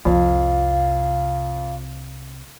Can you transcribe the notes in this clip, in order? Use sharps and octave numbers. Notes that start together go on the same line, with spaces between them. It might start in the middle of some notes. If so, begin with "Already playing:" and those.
C2 F2 C3 F5